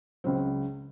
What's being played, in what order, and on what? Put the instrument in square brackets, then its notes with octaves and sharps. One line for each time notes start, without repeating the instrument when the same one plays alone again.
[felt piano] C#2 C#3 F#3 C4